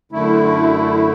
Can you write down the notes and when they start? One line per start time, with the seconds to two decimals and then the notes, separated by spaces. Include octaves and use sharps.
0.12 F#2 D3 A3 E4